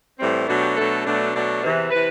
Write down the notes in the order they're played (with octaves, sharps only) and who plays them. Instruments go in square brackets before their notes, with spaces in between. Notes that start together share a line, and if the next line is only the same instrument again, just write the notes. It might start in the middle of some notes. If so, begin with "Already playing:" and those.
[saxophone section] A2 E3 G3 C4
B2 F#3 A3 D4 F#4
G4
B2 F#3 A3 D4 A4
B2 F#3 A3 D4
B2 F#3 A3 D4
E2 C3 E3
C3 E3 B4